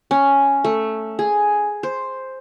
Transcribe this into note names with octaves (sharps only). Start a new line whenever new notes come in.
C#4
A3
G#4
C5